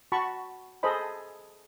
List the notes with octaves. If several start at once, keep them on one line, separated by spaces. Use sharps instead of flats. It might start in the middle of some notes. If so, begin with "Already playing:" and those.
F#4 A5 B5 C#6
G#4 A4 C5 D#5 B5